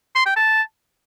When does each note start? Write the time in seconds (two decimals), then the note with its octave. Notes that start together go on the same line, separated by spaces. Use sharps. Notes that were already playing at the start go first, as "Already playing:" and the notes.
0.16 C6
0.26 G5
0.37 A5